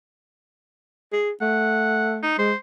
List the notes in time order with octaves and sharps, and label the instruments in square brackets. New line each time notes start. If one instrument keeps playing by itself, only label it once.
[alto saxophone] G#4
[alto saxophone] A3 [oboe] F#5
[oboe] D#4
[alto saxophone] G#3 [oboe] C5